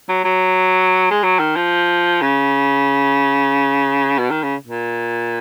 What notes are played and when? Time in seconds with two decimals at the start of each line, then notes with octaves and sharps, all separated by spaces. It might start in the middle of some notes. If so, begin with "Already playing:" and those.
0.09 F#3
0.25 F#3
1.11 G#3
1.24 F#3
1.39 D#3
1.56 F3
2.21 C#3
4.18 B2
4.30 D#3
4.43 C#3
4.67 A#2